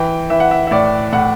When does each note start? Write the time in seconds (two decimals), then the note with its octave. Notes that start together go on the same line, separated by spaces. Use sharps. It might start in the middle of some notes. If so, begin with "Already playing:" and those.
Already playing: E3 G5
0.30 E3 E5
0.40 F#5
0.51 E5
0.67 E5
0.71 A2 D5
1.13 A2 F#5